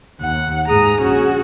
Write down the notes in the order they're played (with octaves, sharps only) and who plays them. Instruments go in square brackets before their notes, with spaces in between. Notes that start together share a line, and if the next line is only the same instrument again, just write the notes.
[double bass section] D#2 [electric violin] F#5
[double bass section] G#2 [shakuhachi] G#4 [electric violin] A#5 D#6
[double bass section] A#1 [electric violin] C#4 F#4